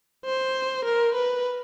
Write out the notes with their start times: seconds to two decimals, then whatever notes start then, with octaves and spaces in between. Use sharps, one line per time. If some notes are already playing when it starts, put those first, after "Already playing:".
0.25 C5
0.85 A#4
1.14 B4